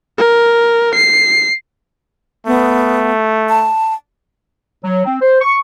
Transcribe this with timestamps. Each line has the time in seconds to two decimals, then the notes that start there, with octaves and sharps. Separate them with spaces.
0.18 A#4
0.95 C7
2.47 A3 B3
3.49 A5
4.83 F#3
5.05 C4
5.21 C5
5.42 C#6